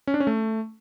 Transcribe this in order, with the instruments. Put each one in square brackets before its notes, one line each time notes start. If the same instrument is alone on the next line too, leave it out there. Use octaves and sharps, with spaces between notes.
[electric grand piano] C#4
D4
C#4
A3